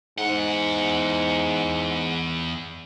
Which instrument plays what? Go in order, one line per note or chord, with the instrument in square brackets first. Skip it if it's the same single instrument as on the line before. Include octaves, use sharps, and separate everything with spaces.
[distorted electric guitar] E2 F#5 [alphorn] G#2